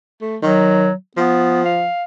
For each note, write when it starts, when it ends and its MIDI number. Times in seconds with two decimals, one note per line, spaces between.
0.21 0.37 57
0.43 0.89 51
0.43 0.92 54
1.17 1.87 53
1.17 1.63 59
1.65 2.04 77